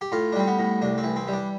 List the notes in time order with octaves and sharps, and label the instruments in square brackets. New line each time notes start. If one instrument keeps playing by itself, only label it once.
[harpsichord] G4
A2 F4
D4
G3 C4
B3
A2
C2 D4
C4
E3
C4
G3
D4